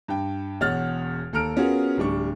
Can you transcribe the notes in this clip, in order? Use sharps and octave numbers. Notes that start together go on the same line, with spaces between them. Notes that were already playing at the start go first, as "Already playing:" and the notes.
G2 G5
E1 E2 C#5 F#5 F6 A6
D#2 A4 A#5 F6 D7
B3 C#4 F4 F#4 G#4 A#4
D1 G3 D4 C#6